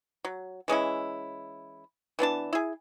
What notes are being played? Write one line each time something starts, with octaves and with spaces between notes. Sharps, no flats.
F#3
E3 G#3 C#4 E4
E3 B3 D4 A5
E4 G#4